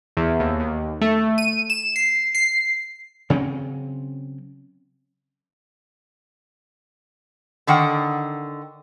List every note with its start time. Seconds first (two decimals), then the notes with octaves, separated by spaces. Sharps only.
0.17 E2
0.40 D#2
0.60 D#2
1.01 A3
1.38 D#7
1.70 E7
1.96 C7
2.35 C7
3.30 C#3 F#3 C4 C#4
7.67 D3 D#3 F#5 G5